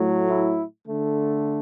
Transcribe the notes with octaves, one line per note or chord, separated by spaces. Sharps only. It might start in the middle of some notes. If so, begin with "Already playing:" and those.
Already playing: A2 F#3 A3
E4
D3 A3